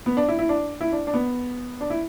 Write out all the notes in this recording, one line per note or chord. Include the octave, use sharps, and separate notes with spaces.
B3
D4
E4
E4
D4
E4
D4
D4
B3
D4
E4